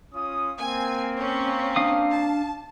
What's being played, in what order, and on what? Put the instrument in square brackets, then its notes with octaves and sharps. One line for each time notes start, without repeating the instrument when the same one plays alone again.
[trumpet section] C#4 F4 D#6
[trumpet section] A#3 C4 [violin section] G#5
[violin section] C#4
[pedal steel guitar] D4 F5 D#6
[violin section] A5